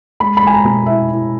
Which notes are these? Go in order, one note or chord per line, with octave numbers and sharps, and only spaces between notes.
G#3 B5
B5
G#3 G#5
A#5
B2
E4 E5
E4